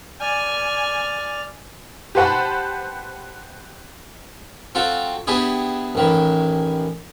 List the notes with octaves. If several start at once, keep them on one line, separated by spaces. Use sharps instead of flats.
D5 G#5 F6
G4 B4 C5 F#5 A5 B5
C4 F4 F#4 A4
B3 D4 E4 G4 G#4
A1 D#3 E3